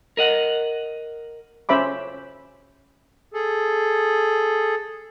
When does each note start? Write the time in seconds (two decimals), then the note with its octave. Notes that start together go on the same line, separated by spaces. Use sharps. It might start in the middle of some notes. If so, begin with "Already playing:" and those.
0.17 A#4 D#5 F#5
1.69 C#4 C5 E5 B5 D6
3.34 G#4 A4